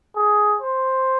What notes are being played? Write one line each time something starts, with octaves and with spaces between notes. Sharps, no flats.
G#4
C5